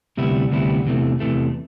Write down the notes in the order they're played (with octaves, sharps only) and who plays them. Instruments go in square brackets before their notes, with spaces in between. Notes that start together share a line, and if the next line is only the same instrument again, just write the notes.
[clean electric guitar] D2 C3 G3 B3 E4
D2 C3 G3 B3 E4
E2 C3 E3 A3
E2 C3 E3 A3